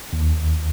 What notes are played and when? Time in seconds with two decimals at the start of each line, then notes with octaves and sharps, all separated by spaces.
0.13 D#2